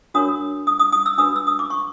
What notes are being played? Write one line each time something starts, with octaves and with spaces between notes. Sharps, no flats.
D4 F#4 A#4 C#5 D#6
D#6
D#6
D#6
E6
D4 F#4 B4 D#6
E6
D#6
D6
C#6